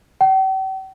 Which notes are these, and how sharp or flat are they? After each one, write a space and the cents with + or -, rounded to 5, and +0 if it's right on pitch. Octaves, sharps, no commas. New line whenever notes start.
G5 -45